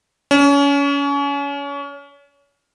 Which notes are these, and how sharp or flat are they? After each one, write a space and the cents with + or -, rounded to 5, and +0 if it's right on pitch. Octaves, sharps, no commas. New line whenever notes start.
C#4 +30